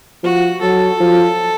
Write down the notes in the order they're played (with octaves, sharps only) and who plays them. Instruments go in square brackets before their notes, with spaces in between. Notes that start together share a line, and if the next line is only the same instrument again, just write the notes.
[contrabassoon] F3 [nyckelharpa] F#4
[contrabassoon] F#3 [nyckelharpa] A4
[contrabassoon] F3